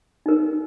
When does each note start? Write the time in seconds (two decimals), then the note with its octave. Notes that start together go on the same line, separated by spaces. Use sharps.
0.26 D#4 A#4